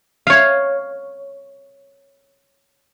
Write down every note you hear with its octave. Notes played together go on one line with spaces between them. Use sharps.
C#5 F5